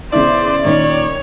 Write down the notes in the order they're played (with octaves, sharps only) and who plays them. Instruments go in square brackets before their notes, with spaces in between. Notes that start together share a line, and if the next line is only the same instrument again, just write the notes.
[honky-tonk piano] C#3 B3 E4 [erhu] C5 [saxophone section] D5
[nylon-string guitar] A#2 C#4 D#4 [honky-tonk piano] D#3 [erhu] C#5